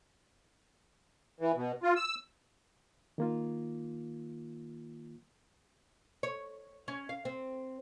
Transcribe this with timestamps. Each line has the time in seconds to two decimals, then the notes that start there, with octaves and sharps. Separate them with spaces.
1.41 E3
1.56 B2
1.83 F4
1.96 E6
3.18 D#3 A#3 F4
6.23 C#5
6.88 C#4
7.09 F5
7.25 C4